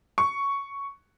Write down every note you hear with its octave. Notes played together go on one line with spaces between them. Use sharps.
C#6